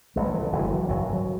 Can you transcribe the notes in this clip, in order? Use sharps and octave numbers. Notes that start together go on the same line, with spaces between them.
A1 A2 G#3
F#3
E3
D3
F#1 F#2 C#3 E3
G#3
F#3
G#1 F#2 C#3 F#3
F#3
F#3